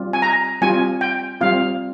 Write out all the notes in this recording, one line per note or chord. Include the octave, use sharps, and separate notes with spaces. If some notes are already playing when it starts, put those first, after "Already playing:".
Already playing: G3 C4 F4
G#5
A#5
G3 C4 F4 G#5
G5
G3 C4 F4 F5